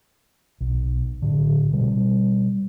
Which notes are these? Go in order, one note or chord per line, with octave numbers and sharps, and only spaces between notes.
B1
A2 D3
B2 G3